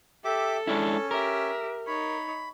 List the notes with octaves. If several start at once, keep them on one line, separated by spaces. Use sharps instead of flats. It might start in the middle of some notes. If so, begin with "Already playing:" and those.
G4 A4 E5 D6
G#3 C#4 D4 E4
G4 A#4 E5
D#4 C#5 B5